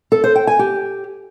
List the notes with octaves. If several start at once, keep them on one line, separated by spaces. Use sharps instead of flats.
A4
C5
G5
G#5
G4